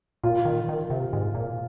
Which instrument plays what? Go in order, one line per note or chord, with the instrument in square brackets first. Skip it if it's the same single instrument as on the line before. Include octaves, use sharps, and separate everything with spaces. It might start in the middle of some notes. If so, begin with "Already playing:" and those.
[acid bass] A#2 [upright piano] F4
[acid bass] D#3
D#3
C3
G#2
A#2